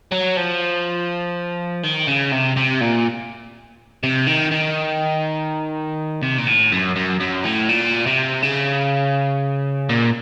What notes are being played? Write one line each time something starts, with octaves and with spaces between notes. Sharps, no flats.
F#3
F3
D#3
C#3
C3
C3
A#2
C3
D#3
D#3
C3
A#2
A2
F#2
F#2
F#2
A2
A#2
C3
C#3
A#2